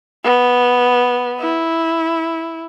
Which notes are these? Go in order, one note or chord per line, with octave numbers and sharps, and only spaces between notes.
B3
E4